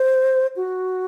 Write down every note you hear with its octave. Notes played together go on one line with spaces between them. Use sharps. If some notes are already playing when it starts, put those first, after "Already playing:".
Already playing: C5
F#4